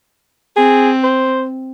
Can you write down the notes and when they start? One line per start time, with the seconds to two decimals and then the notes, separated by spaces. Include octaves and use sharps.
0.56 C4 G#4
1.04 C5